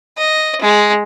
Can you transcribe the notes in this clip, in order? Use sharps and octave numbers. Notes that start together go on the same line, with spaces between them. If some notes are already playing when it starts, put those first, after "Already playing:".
D#5
G#3